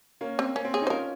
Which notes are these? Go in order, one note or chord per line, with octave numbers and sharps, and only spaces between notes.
A#3 C#4
C4
A#3 C#4
C4
C#4 G#4
D#4
C5
C#4 F4 A#4